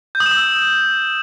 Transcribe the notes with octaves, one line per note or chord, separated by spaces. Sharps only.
G6
D#6
E7
D#6
E6